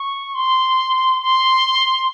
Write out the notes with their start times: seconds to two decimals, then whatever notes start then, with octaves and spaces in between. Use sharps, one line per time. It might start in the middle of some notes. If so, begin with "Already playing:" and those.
Already playing: C#6
0.35 C6
1.22 C6